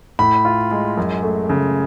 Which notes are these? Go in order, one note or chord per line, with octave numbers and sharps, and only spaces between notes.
A2 B5
F4
G#3
F#2
A3
C#3